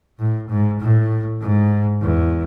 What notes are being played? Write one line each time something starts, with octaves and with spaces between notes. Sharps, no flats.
A2
G#2
A2
G#2
E2